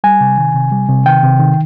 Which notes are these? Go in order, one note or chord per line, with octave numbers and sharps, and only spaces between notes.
G3 G#5
C3
D#3
C3
G3
C3
D#3 G5
C3
D#3